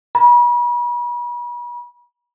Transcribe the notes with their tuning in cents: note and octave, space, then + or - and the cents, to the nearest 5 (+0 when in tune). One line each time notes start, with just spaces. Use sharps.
B5 -40